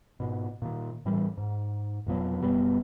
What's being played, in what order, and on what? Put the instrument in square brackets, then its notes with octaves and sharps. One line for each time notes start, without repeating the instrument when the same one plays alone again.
[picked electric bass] G#2 B2
A#2 D#3
A2 E3 G3
G#2
F1 B2 F3 F#3
F#1 B2 G3 B3